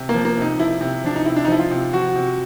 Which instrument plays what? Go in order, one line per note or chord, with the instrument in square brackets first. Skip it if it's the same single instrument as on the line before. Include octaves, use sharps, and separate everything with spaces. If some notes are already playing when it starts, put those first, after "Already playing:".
Already playing: [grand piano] C3
A#3
F3
A#3
C3 D#4
F3 E4
C3
F3 D4
D#4
C3 E4
D4
D#4
F3 E4
F4
C3
F3 F#4
C3